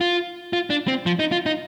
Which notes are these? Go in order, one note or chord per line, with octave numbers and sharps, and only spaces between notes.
F4
F4
D4
C4
F3
D#4
F4
D#4